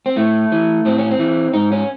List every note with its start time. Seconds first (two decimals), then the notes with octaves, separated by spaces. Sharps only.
0.06 C4
0.16 A2 A3
0.52 E3
0.85 A2 C4
0.98 C#4
1.11 C4
1.19 E3
1.53 G#2 D#4
1.72 C#4